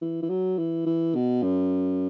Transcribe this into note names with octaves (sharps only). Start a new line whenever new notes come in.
E3
E3
F#3
E3
E3
B2
F#2